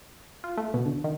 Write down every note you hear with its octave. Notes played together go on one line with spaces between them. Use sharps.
F4
A3
B2
D2
D#3